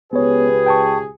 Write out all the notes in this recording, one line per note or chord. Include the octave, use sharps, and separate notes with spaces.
C#2 B3 G4 G#4 B4 C#5
G5 A5 C#6